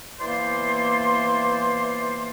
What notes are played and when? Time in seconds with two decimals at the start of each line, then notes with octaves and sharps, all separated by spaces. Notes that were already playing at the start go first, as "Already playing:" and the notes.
0.20 E3 A#3 B3 C5 D5 C6